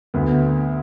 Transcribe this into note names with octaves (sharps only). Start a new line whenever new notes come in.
D2 B3